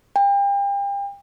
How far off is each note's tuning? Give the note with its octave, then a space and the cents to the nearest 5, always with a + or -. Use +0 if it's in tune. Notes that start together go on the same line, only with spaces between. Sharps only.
G5 +35